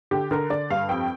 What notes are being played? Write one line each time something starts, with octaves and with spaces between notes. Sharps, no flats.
D3 G4
D3 A#4
D3 D5
G2 F5
F2 G5